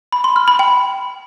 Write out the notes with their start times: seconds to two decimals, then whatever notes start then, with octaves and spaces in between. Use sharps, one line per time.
0.12 B5
0.24 C6
0.36 F6
0.48 B5
0.59 G5